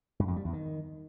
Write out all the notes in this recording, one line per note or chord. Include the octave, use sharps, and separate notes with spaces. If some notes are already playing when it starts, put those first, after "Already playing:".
G2
F2
G3
E2
D#3